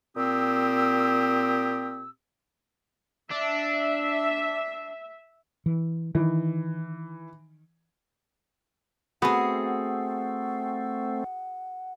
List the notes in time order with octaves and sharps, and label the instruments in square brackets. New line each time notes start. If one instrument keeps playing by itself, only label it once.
[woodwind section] A#2 C4 G4 D#6 E6
[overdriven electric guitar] D4 [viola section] E5
[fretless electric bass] E3
[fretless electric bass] D#3 [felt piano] E3
[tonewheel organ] A3 C4 [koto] B3 [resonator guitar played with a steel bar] F#4 G#4 [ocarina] F#5